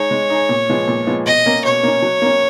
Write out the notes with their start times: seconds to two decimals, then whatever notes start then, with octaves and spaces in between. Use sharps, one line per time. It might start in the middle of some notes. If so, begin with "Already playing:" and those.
Already playing: G#3 D#4 G#4 C#5
0.11 G#3
0.30 D#4 G#4
0.49 A#2
0.70 F3 G#3 B3
0.88 A#2
1.07 F3 G#3 B3
1.26 B2 D#5
1.46 A#3 C#4
1.65 B2 C#5
1.83 A#3 C#4
2.02 F#3
2.22 A#3 C#4